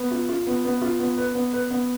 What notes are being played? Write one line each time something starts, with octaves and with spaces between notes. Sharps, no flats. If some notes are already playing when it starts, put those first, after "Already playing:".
Already playing: B3
F4
F4
B3
B3
F4
B3
B4
B3
B4
B3